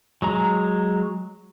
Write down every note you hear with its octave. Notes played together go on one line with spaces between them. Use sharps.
F#3 G#3 A#5